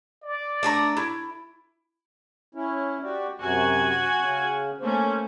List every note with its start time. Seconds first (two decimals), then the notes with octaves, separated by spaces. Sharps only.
0.22 D5
0.63 A3 D4 A#5
0.97 E4
2.55 C#4 E4
3.03 F#4 G4 D5
3.40 F#2 C3 F#4 G#5
4.20 C#3 C#4
4.81 A3 A#3 C#4 C5